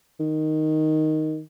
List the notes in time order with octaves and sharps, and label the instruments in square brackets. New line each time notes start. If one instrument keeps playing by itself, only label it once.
[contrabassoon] D#3